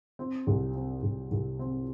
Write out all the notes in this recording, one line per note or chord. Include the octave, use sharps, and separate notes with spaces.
C4
C2
C4
C2
C2
C4